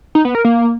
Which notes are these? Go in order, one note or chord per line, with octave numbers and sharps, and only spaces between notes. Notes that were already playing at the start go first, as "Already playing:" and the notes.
D#4
B3
A#4
A#3